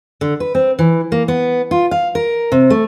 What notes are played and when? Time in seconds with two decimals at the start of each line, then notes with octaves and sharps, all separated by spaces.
0.21 D3
0.40 B4
0.55 C4
0.79 E3
1.12 A#3
1.28 B3
1.71 F4
1.91 F5
2.15 A#4
2.52 C3
2.70 A3